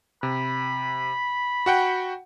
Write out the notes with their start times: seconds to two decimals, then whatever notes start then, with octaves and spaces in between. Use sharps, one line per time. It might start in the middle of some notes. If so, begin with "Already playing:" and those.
0.23 C3 B5
1.66 F#4 F#5 G5